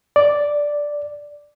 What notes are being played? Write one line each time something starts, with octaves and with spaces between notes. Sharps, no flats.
D5